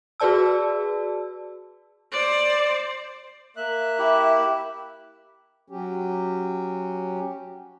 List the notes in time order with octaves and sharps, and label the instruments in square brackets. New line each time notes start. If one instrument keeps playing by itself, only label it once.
[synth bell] F#4 G#4 B4 D5 A5 E6
[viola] C5 D5
[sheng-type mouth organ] A#3 E5 F#6
[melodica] E4 G4
[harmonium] F#3 C#4 G4